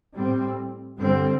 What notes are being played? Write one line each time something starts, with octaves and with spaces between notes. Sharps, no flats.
A2 G3 C4
G2 D3 G3 C4